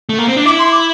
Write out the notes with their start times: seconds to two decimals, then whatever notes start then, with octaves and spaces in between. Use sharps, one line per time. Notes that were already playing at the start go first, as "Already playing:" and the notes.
0.09 A3
0.18 A#3
0.28 C4
0.36 D4
0.45 E4 D6
0.59 C6
0.72 D6